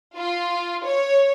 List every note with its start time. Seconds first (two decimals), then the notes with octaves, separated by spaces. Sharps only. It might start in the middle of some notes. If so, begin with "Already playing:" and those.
0.16 F4
0.84 C#5